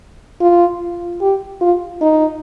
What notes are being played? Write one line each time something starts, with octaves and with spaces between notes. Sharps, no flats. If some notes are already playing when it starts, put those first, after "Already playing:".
F4
G4
F4
D#4